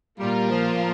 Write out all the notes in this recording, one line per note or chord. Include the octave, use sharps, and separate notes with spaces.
A#2 G3 A#3 F4 A#4
F3